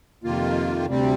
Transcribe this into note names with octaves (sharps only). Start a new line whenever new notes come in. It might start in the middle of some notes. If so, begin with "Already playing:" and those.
F2 C3 D#3 A#3 F4
D2 C3 G3 C4